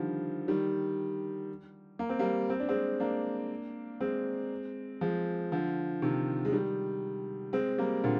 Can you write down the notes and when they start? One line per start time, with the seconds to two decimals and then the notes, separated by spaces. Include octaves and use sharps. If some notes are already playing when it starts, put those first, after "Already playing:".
Already playing: D3 D#3 F3 G3
0.48 D#3 G3
1.99 A#3
2.09 C4
2.19 G3 A#3
2.50 C4
2.60 D4
2.69 G#3 C4
3.00 A#3 D4
4.00 G#3 C4
5.01 F3 G#3
5.52 D3 F3
6.02 C3 D#3
6.45 G#3
6.52 D#3 G3
7.53 G#3 C4
7.78 G3 A#3
8.04 A#2 D3